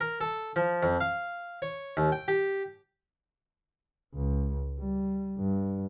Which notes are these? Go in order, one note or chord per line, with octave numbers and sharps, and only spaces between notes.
A#4
A4
F3
F2
F5
C#5
D#2
G5
G4
C#2
G3
G2